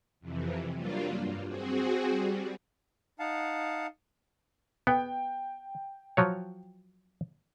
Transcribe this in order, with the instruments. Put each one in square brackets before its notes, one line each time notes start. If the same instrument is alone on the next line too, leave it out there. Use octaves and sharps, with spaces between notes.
[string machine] F2 C3 E3
F#3 G3 A#3 D4 F4
G2
C4 F#4 G#4
G3
[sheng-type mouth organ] D#4 F5 F#5 A5
[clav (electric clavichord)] B3 [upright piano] G5
[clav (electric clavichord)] F3 F#3 C#5